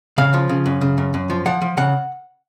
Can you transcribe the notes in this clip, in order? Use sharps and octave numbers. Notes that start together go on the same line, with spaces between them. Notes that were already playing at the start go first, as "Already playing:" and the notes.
C#3 F5
F3
C#3
F#2
C#3
F#2
F#2
F3
F3 F#5
F3
C#3 F#5